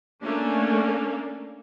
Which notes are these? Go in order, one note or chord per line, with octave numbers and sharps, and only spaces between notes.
A3 A#3 C#4 D4